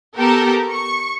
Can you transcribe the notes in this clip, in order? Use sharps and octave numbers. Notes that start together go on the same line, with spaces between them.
B3 G4 A4 A#4
C#6